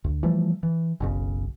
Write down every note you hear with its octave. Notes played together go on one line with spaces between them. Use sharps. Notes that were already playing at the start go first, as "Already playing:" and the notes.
D2
E3 F3 G3 A3
E3
F#1 B1 C#3